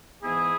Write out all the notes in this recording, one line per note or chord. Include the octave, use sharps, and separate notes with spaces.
G#2 E3 B3 E4 G#4